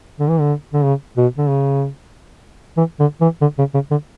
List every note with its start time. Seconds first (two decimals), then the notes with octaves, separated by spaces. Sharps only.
0.20 D3
0.29 E3
0.40 D3
0.73 D3
0.84 C#3
1.17 B2
1.38 D3
1.49 C#3
2.77 E3
3.00 D3
3.21 E3
3.41 D3
3.59 C#3
3.74 C#3
3.91 D3